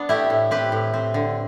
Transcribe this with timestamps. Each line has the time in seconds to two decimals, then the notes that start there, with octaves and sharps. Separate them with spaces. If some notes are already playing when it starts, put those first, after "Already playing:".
Already playing: B3 D4
0.09 A3 E4 G4
0.30 A2
0.51 C4 G4 B4
0.72 A2
0.94 C4
1.14 D3